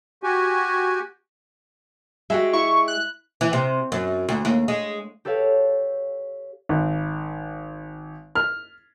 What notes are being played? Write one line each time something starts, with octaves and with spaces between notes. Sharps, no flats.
F#4 G4 G#5
G#3 F#4 G4 E5
E4 C#6
F#6
E3
C3
F#2
D2
D#2
G#3
G4 A4 B4 C#5 F5
G#1
F6